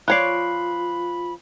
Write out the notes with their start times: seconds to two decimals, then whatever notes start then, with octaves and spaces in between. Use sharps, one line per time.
0.08 F3 F4 C#5 D5 B5 F#6 C7